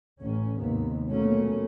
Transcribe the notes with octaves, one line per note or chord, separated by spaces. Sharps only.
A1 C#4
D#2 G#2 C3 B3
B2 F3 F#3 A3 A#3 C#4